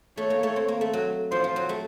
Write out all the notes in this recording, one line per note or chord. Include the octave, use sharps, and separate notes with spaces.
A3 C#5
A#3
A3
C4
A#3
A3
F#3
F3 C5
F3
F#3
A3